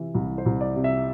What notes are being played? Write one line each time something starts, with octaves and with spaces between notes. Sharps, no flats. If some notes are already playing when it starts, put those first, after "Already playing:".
Already playing: C3 E3
C2
C5
C2
D5
C3
E5